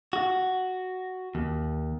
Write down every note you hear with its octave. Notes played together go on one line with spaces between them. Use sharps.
F#4
D#2